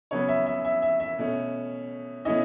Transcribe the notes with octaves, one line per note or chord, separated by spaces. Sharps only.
C#3 F#3 B3 C#5
E5
E5
E5
E5
E5
B2 A3 C#4
B2 A3 C#4 E4 D#5